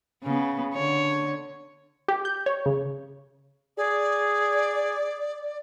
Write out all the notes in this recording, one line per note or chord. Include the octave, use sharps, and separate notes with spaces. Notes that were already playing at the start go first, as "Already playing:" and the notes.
C#3 B3
D3 C#5
G4
G6
C#5
C#3
G#4 D5